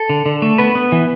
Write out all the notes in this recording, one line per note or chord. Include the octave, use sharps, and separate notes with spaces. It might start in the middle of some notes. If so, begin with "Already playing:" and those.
Already playing: A4
D3
D3
A3
B3 B4
B3
E3